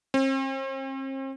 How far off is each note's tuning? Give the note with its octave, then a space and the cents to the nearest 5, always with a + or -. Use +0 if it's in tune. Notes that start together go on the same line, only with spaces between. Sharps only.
C4 +45